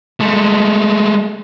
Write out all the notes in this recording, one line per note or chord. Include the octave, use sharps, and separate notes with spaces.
G#3 A3